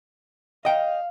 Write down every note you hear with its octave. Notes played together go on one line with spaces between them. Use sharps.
D#5 F5 G5